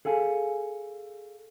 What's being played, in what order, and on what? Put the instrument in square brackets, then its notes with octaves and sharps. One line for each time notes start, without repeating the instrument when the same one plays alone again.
[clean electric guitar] G#4 A4 F5 G#5